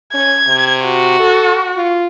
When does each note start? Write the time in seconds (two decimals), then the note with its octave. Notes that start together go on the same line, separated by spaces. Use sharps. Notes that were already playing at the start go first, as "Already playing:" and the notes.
0.14 C#4 G#6
0.47 C3
0.84 F#4
1.19 A4
1.76 F4